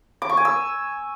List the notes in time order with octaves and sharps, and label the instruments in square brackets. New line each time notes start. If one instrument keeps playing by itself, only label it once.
[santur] D6
C#6
G#5
E6